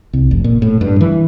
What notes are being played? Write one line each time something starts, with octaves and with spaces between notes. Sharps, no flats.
C2
F1
A#2
A2
G2
E3